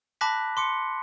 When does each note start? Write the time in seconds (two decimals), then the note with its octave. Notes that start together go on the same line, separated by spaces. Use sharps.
0.21 A5 B5 D6 F#6 A#6 B6
0.57 C6 D6 C#7